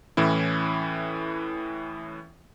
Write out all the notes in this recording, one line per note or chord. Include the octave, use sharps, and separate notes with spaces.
A2 E3 C#4 E4